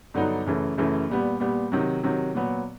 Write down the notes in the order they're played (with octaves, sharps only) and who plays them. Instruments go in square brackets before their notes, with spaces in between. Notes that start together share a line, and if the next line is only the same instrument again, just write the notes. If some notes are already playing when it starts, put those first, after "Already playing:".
[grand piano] G2 D3 F#3 B3 D#4
F#2 C#3 E3 A3
F#2 C#3 E3 A3
A#2 G3 B3
A#2 G3 B3
C3 D#3 F#3
C3 D#3 F#3
A#2 F#3 B3